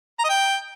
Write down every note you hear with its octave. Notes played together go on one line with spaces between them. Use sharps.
A#5
D#5
G5